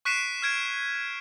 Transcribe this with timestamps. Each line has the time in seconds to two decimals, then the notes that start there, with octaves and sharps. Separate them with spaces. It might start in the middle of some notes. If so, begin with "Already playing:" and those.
0.05 C#6 F#6 B6 C7 D7 E7
0.42 F6 G#6 D7